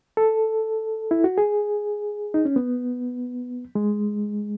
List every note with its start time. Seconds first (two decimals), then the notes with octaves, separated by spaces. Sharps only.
0.17 A4
1.11 E4
1.24 F#4
1.38 G#4
2.34 D#4
2.45 C#4
2.56 B3
3.75 G#3